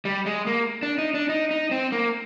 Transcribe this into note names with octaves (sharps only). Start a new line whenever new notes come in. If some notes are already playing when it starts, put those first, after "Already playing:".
G3
G#3
A#3
D4
D#4
D4
D#4
D#4
C4
A#3